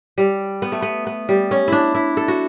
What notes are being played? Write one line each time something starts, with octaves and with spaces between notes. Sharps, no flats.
G3
B3
A3
B3
B3
G3
C#4
D4 E4
E4
A4
F#4